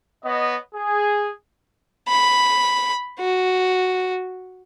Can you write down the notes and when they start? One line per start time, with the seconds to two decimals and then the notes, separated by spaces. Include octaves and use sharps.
0.24 B3 C#5 D#5
0.75 G#4
2.08 B5
3.20 F#4